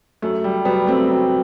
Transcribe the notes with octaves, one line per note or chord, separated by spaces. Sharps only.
F#2 A3
G3
F#3 G3 B3
A3 C4
F#3